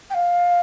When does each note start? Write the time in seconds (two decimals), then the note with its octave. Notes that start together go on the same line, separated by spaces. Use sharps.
0.10 G5
0.14 F5